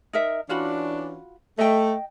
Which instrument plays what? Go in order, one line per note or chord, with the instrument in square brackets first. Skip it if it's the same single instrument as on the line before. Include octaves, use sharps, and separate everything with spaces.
[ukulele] D#4 A#4 E5
[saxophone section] E3 C#4 D4 [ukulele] F4 F#4 B5
[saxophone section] A3 [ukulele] D#5 G5